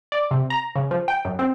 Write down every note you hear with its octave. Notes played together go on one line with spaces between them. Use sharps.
D5
C3
A#5
C#3
F3
G5
F#2
C4